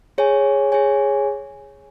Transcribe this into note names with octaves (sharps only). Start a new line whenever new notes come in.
G#4 C#5 G#5
G#4 C#5 G#5